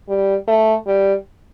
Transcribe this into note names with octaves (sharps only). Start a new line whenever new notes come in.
G3
A3
G3